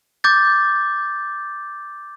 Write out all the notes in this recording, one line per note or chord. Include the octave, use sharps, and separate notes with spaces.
D6 G6 A6